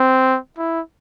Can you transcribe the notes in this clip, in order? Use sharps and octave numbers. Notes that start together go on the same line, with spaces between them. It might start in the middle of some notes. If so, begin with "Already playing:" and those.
Already playing: C4
E4